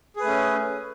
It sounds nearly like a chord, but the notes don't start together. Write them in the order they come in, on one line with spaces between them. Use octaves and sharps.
G#4 B4 A3 C#4